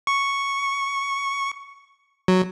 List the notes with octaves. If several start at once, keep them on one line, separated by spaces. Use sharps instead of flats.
C#6
F#3